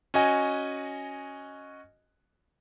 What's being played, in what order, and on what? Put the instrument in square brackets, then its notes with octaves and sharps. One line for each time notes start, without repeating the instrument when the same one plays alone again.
[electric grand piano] C#4 F#4 D#5 G#5